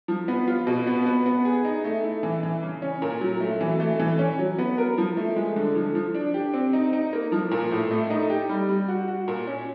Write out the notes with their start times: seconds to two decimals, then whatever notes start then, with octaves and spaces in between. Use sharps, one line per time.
0.08 F3
0.28 B3
0.48 F4
0.67 B2
0.87 B3
1.06 B3
1.26 B3
1.45 G#4
1.65 D#4
1.84 A3
2.04 E4
2.23 E3
2.43 E3
2.63 C#3
2.82 C#4
3.02 A#2
3.21 F#3
3.40 A3
3.61 E3
3.80 A3
4.00 E3
4.19 C#4
4.39 F#3
4.58 B3
4.78 A#4
4.98 F3
5.17 A3
5.36 G#3
5.56 D3
5.75 F3
5.95 F3
6.15 D4
6.34 G4
6.54 C4
6.73 D#4
6.93 D#4
7.13 A#3
7.32 F3
7.51 A#2
7.71 A2
7.91 A3
8.10 D#4
8.30 G4
8.49 G3
8.69 G3
8.88 F#4
9.08 F#4
9.28 A#2
9.47 C#4